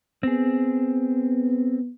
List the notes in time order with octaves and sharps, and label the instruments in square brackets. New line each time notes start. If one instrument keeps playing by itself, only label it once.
[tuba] B3 [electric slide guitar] C4 G#4